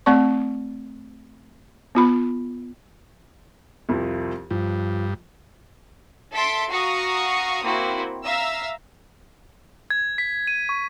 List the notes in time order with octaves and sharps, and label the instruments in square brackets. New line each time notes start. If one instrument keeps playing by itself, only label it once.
[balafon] A3 C4 D5 C#6
B3 F4 B5
[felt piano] C2 F2 F3
[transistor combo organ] G2 [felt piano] F3
[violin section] A4 E5 A5 C6 B6 D7
F#4 F5 A#5 C#6 D#6
A#3 C4 E4 F#4
E5 F5 A#5 E6
[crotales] G#6
B6
D#7
C#6